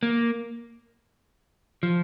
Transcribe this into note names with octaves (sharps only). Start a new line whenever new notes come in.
A#3
F3